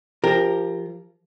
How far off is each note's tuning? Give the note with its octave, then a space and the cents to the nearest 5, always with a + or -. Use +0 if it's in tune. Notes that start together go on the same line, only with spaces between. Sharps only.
F3 -15 G4 +15 A#4 +0